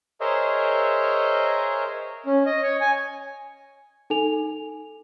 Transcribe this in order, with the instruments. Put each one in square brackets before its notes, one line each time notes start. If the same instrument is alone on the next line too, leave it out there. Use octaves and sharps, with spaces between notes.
[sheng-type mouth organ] G#4 A#4 C5 C#5 D#5 E5
C#4
D#5
C#5
G#5
[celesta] D#4 A4 G#5 F7